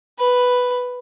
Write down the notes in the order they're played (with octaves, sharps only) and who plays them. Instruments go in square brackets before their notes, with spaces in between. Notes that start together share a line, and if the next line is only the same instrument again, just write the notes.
[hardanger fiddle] B4